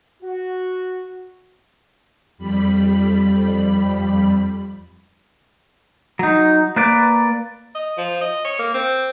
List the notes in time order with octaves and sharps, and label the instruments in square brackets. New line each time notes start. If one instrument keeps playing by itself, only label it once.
[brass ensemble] F#4
[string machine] F2 G3 B5
[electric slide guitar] F#3 D#4
A#3 B4 D5
[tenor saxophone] D#5
F3
D#5
C#5
A#3
C4